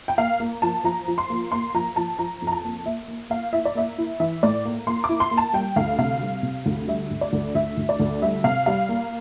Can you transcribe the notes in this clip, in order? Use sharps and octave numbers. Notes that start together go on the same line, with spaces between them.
G5
A#3 F5
A#3
F3 A5
F3 A#5
F3
C6
A#3
A#3 C6
F3 A#5
F3 A5
F3 A#5
F2
A#5
A5
A#3
A#3 E5
A#3
A#3 F5
E4 E5
D5
A#3 E5
E4
E3 E5
A2 D5
A#3
A#3 C6
D6
E4
C6
A#3
A5
G3 G5
D2 F5
C3 F5
G3
C3
D2
G3 E5
D2
D5
D2
D2 E5
D2
D5
D2
G3 E5
C3 F5
G3 F5
A#3